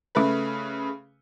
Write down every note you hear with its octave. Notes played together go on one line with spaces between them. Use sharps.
C#3 A3 B4